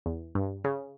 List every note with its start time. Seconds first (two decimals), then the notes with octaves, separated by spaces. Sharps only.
0.06 E2
0.35 G2
0.64 C#3